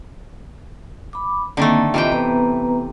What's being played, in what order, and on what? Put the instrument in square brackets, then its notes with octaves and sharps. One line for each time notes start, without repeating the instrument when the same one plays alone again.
[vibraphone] B5 D6
[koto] D3 D#3 A3 [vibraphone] A#3 C4
[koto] C3 E3 G5 [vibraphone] F4 D#5 E5
[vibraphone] B3 B4 A#5